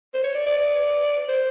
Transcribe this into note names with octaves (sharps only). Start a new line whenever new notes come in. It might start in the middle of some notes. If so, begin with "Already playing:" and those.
C5
C#5
D5
D5
D5
C5